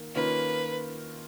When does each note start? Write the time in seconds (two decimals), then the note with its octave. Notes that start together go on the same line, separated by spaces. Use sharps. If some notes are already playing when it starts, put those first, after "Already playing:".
Already playing: D#3 A#3
0.15 D#3 A#3 C#4 F4 B4